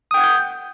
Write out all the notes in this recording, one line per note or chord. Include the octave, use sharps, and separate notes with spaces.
F#5 G5 D#6 G6 G#6